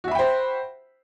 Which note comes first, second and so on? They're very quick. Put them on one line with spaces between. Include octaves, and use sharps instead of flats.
F#4 E5 B5 G5 C5